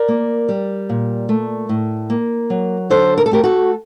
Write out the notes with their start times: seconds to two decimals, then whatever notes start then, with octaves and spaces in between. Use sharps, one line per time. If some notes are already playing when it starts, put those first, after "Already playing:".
Already playing: A#4 D5
0.08 A#3
0.49 G3
0.89 A#2
1.29 A3
1.69 A2
2.10 A#3
2.50 F#3
2.90 D3 A4 C5
3.18 A#4
3.26 A4
3.31 A3 G4 A#4
3.44 F#4 A4